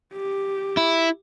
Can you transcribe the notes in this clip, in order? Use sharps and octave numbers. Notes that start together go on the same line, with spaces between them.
G4
E4